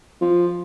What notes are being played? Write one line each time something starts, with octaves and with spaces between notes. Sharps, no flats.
F3